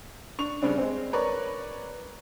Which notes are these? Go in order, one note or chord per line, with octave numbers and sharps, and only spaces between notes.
D4 C#6 F7
G2 C#3 C4 D4
G#3 C4
A#4 B4 C#5 D5 C#6